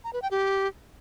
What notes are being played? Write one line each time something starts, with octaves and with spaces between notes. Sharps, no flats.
A#5
B4
G5
G4